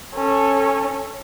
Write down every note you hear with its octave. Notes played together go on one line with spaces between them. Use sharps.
C#4 A4